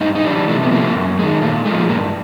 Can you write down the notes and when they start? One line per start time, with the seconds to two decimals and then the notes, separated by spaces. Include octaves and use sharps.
0.01 G2 D#4
0.15 D#4
0.24 E3 G3 D4
0.49 C3 A3
0.62 B3
0.71 F3 A3 A#3
0.95 F#2
1.19 D#3 G#3
1.42 A#2 A3
1.65 G#3 A3
1.69 F3
1.89 G2 A#3